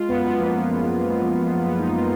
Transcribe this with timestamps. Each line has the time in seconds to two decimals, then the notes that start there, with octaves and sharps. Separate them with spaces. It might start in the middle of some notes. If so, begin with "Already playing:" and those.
Already playing: G#3 F4
0.09 F#2 B3
0.24 B3
0.39 F3 A#3
0.70 F#2
1.01 G#3
1.32 F#2
1.62 F3 B3
1.78 D#4
1.94 F4